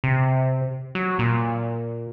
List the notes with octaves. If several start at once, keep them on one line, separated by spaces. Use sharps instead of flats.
C3
F#3
A#2